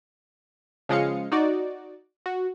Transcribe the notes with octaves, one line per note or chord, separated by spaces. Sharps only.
C#3 F3 G#3 D#5 F5 C#7
D#4 F#4 D5
F#4